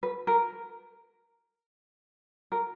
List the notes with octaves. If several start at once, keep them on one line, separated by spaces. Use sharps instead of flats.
B4
A#4
A#4